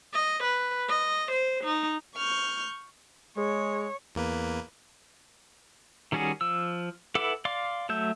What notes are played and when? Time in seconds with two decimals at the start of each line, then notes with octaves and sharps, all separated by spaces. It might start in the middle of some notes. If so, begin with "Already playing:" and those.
0.14 D#5
0.44 B4
0.89 D#5
1.32 C5
1.64 D#4
2.15 C#6 F6 G6
3.38 G#3 G#4 C#5
4.15 E2 A#3 B4
6.12 D#3 G3 C#4 F#4 G#4
6.41 F3 E6
7.15 E4 A4 B4 F#5 D6
7.45 D5 F5 C6 D6
7.89 F#3 A3 E5 G6